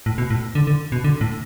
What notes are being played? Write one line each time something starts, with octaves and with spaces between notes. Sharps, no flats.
A2
B2
A2
D3
D3
B2
D3
A2